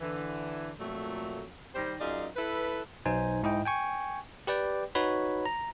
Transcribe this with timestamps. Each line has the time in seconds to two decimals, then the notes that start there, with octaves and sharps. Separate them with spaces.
0.01 D3 E3
0.79 F2 A#2 F#3 A3
1.74 D#3 G3 G4 C5
1.99 F#2 D#4 F4 G#4 D5
2.36 E4 A4 B4
3.06 B1 D#4 C5 G#5
3.43 G#2 E4 D#5 G5
3.65 G5 G#5 C#6
4.47 G4 B4 D5 G5
4.95 D#4 F#4 B4 C#5 B5
5.46 A#5